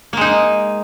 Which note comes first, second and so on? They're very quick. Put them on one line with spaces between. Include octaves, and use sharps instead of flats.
A#3 G#3 D#4